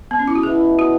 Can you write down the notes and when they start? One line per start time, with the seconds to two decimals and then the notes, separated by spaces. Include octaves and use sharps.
0.11 B3
0.19 C#4
0.28 E4
0.35 F#4
0.43 B2 B3 E4 G#4
0.79 F#4